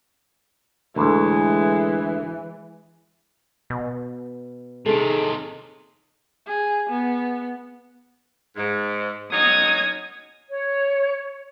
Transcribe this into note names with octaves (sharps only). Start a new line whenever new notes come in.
D2 A2 E3 G#3
B2
C3 D#3 D#4 G#4 A4
G#4
B3
G#2
F#3 C#4 D#4 D#6 G#6
C#5